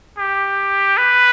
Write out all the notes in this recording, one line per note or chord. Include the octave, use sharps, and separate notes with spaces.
G4
B4